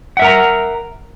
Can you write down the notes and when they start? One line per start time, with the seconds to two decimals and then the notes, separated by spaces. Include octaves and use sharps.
0.17 F#5
0.19 E5
0.22 A#4
0.25 A#5